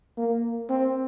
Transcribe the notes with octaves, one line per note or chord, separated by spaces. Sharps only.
A#3
C4